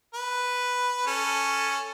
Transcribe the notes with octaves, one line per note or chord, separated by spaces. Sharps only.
B4
C#4 A4